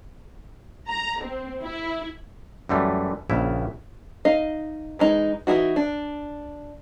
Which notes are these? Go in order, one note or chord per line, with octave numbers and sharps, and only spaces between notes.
A#5
C4
E4
F#2 E3 G3 A3
A#1 C#3 E4
D#4 D#5 F5
E3 G#3 D#4
E3 F#3 D#4 E4 F#4
D4